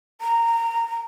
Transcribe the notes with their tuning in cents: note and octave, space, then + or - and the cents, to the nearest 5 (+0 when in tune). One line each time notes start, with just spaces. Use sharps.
A#5 -15